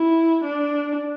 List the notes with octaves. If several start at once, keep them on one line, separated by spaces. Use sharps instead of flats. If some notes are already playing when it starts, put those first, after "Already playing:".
Already playing: E4
D4